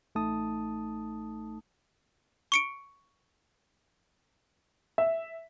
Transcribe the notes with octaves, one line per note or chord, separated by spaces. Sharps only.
A1 A3 D#4 A5 D#6
C#6 C#7 D7
E5